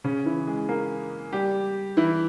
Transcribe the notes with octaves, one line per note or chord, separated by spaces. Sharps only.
C#3 C#4
E3 E4
G#3 G#4
A#3 A#4
G3 G4
E3 E4